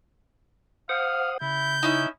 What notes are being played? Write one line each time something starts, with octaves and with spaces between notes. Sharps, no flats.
C5 F5 F#5 D#6
C#3 E4 G6
C#4 D#4 E4 E5